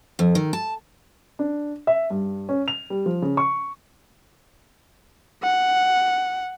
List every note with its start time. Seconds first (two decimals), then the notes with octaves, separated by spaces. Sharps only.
0.19 F2
0.35 D#3
0.53 A5
1.39 D4
1.87 E5
2.10 G2
2.49 C#4
2.68 F7
2.90 G3
3.06 F3
3.22 C#3
3.37 C#6
5.43 F#5